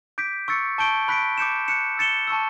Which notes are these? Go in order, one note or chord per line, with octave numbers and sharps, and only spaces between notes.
D6 G6 B6 D7
C#6 E6 A6 C#7
A5 C#6 G6 D7 G7
B5 F#6 B6 D7
D6 G6 C#7 E7
F#6 C#7 E7
E6 A6 C#7 E7 G7
A5 C#6 E6